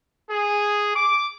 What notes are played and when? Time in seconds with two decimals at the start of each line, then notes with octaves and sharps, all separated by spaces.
0.30 G#4
0.96 D6